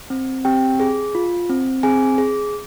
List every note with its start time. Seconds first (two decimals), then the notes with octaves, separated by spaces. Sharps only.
0.10 C4
0.45 C4 G4 G5
0.80 G#4
1.15 F4
1.50 C4
1.83 C4 G#4 G#5
2.18 G#4